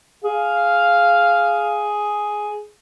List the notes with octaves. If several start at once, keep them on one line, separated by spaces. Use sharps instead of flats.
G#4 F5